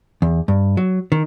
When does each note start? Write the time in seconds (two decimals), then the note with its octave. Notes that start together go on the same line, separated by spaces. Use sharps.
0.22 E2
0.48 G2
0.77 F#3
1.12 D#3